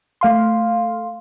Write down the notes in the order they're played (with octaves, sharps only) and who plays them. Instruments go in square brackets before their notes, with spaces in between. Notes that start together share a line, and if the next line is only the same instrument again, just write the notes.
[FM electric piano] A3 F5 C6